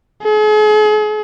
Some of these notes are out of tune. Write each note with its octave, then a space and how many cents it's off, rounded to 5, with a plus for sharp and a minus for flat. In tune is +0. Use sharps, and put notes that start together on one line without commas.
G#4 +40